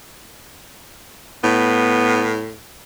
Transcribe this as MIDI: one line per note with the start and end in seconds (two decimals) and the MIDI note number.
1.44 2.54 45
1.44 2.44 59